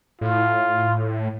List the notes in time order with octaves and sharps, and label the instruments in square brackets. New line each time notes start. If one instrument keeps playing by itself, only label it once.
[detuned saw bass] A2 [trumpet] F4